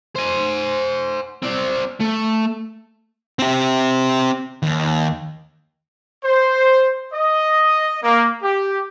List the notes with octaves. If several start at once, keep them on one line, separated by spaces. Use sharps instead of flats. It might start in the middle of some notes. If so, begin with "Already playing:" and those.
C5 G#5
C4 D5
A3
C4 G4
D#2
C5
D#5
A#3
G4